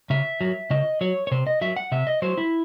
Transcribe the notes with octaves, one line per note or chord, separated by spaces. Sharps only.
C#3 E5
F#3
C#3 D#5
F#3 C#5
C#5
C3 C5
D#5
F#3 E5
F#5
C3 E5
D#5
F#3 C5
E4